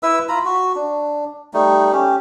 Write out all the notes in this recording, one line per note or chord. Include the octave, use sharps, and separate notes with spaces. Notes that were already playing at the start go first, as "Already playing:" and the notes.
E4 B4 E5 E6
F4 A#5 B5
F#4
D4
G3 A3 D#4
C#4 G4